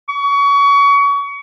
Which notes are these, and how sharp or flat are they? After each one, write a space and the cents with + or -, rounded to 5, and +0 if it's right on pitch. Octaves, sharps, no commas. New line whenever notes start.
C#6 +30